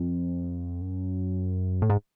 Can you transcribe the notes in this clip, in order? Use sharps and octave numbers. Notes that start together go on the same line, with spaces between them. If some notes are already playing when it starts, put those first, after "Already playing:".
Already playing: F2
F#2
A2
G#2